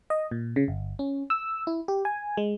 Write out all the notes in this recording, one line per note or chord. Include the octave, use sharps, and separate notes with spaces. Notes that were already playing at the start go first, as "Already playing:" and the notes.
D#5
A#2
C#3
G1
C#4
E6
E4
G4
G#5
G#3